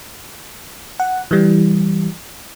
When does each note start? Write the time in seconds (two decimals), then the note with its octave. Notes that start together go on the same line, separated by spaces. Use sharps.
1.00 F#5
1.31 E3 G3